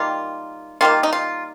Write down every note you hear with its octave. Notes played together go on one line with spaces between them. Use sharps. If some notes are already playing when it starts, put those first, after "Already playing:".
Already playing: D#3 G3 A#3 F4
D#3 G3 A#3 F4
D#4
F4